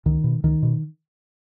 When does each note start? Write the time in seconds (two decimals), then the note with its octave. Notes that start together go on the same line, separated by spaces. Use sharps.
0.06 C#2 D#3
0.24 B2
0.44 C#2 D#3
0.63 B2